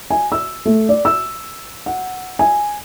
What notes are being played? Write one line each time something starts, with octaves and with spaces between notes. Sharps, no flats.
G#5
E6
A3
D5
E6
F#5
G#5